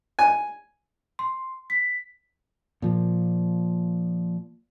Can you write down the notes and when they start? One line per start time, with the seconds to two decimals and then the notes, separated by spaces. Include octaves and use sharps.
0.19 G#5
1.19 C6
1.70 B6
2.82 A#2 F3